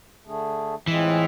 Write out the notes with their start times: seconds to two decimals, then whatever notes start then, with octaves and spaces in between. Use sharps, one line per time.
0.25 D3 A3 D4 G#4
0.87 A2 E3 G#3 C4 F4 G#4